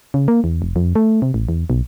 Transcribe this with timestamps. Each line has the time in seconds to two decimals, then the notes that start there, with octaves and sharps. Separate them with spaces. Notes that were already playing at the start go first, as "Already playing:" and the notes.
0.14 C#3
0.28 A#3
0.44 E2
0.62 F1
0.76 F2
0.95 A3
1.22 C3
1.34 A1
1.49 E2
1.70 B1